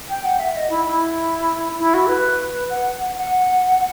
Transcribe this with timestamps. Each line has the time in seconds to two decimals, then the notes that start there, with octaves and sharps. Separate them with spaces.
0.09 G5
0.24 F#5
0.39 E5
0.55 D#5
0.69 E4
0.85 E4
1.78 E4
1.93 F#4
2.08 B4
2.69 F#5
3.16 F#5